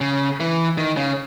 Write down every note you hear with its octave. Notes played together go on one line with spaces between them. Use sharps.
C#3
E3
D#3
C#3